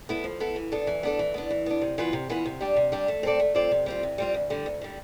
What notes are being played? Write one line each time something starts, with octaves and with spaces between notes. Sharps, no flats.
B3 E4 A4
F3
B3 E4 A4
E3
B3 D4 A4
E3
B3 D4 A4
E3
B3 D4
E3
B3 D4
C3
E3 B3 F4 B4
C3
E3 B3 F4 B4
C3
G3 D4 G4
C3
G3 D4 G4
A3
C4 F4 A4 D5
A3
C4 F4 A4 D5
C3
G3 C4 F4
C3
G3 C4 F4
D2
D3 G3
D2
D3 G3